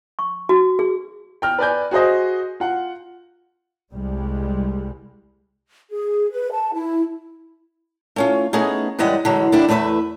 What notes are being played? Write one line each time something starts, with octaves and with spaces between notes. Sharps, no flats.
C#6
F#4
G#4
G5 F6
B4 D5 G#5 G6
F#4 G#4 C5 D#5
F4 F#5
C2 G3 G#3
G#4
B4
A5
E4
A3 C#4 F4
A3 B3 C#4 D#4 G#4
F#2 E3 G3 G#3 D#5 F#5
D3 E3 F#3 G#3
D3 G3 D4 E4
E2 A3 B4 C#5 E5